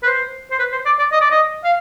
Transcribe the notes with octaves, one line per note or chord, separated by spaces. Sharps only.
B4
C5
C5
B4
C5
D5
D5
D#5
D5
D#5
F5